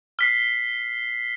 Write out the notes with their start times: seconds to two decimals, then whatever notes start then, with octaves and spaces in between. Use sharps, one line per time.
0.19 F6 B6 C7